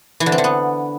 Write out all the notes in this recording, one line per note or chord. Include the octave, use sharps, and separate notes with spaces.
E3
D3
C4
D3
B3